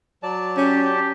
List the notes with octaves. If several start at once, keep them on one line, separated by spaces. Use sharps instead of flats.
F#3 D5 A5
C#4 G4
G4